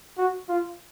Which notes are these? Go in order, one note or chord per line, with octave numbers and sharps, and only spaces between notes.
F#4
F4